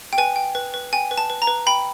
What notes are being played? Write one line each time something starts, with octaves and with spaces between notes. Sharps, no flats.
G5
B4 G#5
G5
B4
B4
G5 G#5
B4
A5
B4
A#5
B4
G5 B5